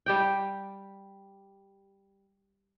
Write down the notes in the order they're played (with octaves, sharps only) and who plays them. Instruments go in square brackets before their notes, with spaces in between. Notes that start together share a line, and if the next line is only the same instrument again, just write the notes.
[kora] G3 G4 G5